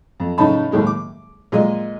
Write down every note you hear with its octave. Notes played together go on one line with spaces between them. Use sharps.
F2
A2 C#3 D#4 A5 B5
D#2 A2 G#3 A#3
D6
A#2 G#3 D#5